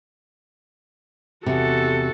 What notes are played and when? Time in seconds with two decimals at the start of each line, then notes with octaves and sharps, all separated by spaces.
1.46 E2 C3 F#4 A4